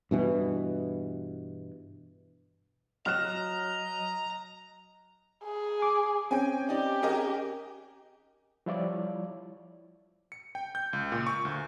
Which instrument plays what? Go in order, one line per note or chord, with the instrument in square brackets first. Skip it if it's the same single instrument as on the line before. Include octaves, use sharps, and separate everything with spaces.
[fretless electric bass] G2 B2 E3
[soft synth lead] F#3 [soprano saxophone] D#5 [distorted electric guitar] A#5 [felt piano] F6 F#6 E7
[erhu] G#4
[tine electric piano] D6
[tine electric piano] C4 C#4 [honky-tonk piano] G5 G#5
[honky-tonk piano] D#4 D5 [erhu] G4
[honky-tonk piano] G#4 A#4 D#5
[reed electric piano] F3 G3 E4 F4 C#5 D5
[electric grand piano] C#7
G5
G6
C#2
A#2
C#6
D2